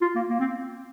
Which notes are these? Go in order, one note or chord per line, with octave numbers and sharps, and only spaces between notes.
F4
A#3
A#3
C4